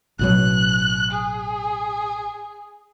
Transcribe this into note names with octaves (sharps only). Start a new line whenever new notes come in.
A1 B2 F#3 F#6
G#4